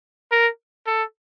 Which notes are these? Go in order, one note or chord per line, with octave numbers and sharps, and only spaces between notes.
A#4
A4